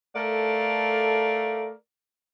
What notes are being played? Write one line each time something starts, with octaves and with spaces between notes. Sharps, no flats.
A3 A4 A#4 D5 F5